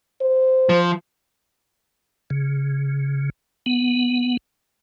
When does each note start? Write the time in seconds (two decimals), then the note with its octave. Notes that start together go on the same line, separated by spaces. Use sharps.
0.21 C5
0.69 F3
2.30 C#3
3.66 B3